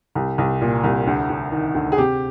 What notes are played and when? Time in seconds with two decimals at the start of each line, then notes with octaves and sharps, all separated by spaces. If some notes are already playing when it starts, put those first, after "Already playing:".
0.15 C2
0.38 C2
0.61 A#2
0.84 C2
1.07 D2
1.30 D2
1.52 D#3
1.75 D2
1.92 G#4
1.98 C3 G4